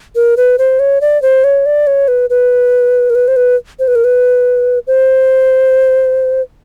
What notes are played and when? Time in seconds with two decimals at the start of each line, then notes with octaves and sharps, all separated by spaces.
0.16 A#4
0.37 B4
0.58 C5
0.79 C#5
1.01 D5
1.22 C5
1.44 C#5
1.66 D5
1.87 C#5
2.08 B4
2.30 B4
3.10 A#4
3.15 B4
3.28 C5
3.36 B4
3.79 C5
3.88 B4
3.95 A#4
4.04 B4
4.87 C5